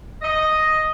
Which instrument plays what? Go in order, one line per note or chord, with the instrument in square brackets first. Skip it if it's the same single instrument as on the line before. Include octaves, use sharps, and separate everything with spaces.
[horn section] D#5